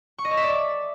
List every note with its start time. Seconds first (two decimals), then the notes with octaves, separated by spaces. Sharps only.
0.18 C#6
0.25 D#5
0.31 A4
0.37 E5
0.43 D5